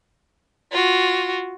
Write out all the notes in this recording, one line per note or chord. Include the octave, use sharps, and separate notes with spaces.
F4 F#4